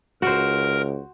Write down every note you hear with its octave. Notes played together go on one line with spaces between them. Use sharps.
C#2 F#4 A#4 C5